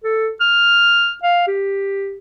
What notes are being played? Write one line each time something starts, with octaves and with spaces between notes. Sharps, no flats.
A4
F6
F5
G4